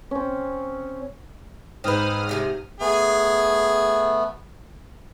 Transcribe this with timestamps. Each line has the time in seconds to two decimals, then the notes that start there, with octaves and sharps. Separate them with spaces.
0.11 C4 C#4
1.84 G#2 C4 B4 D#6 F6
2.29 C3 F3 G#3
2.80 A3 B3 G#4